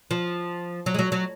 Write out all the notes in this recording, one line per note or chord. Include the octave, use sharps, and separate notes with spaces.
F3
F#3
G#3
F#3
F#3